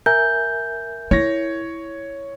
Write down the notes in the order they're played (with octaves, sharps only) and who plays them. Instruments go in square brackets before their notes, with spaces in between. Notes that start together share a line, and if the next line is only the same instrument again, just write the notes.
[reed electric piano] A#4 E5 G#5 [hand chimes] G6
[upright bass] E4 [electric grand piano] C#5 A#6